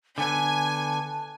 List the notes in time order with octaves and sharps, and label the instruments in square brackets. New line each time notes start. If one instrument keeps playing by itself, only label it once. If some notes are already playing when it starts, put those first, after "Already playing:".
[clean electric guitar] D3 B3 [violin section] G#5 [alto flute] A5